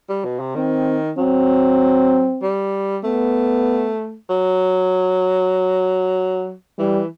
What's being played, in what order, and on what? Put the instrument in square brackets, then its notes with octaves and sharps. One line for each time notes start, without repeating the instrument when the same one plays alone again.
[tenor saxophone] G3
B2
C3
[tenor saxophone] D#3 [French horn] C4
[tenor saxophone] F#3 [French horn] C4
[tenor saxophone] G3
[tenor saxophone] A3 [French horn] B3
[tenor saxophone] F#3
[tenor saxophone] E3 [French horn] G3